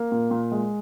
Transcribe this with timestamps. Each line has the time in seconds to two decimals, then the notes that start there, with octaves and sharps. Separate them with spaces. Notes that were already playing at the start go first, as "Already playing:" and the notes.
Already playing: A#3
0.12 A#2
0.31 A#2
0.52 G#3